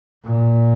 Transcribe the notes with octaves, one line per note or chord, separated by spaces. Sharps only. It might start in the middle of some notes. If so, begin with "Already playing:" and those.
A#2